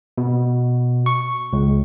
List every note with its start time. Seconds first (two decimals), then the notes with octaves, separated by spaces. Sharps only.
0.18 B2
1.06 C#6
1.53 C#2